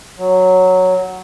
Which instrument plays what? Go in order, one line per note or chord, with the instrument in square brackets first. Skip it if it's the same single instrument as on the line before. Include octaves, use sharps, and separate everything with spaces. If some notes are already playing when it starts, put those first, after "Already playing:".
[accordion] F#3